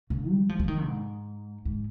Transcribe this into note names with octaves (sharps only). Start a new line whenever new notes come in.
C#3
G3
F3
F3
D#3
G#2
G#2